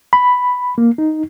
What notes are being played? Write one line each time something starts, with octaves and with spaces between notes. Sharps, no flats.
B5
A#3
D#4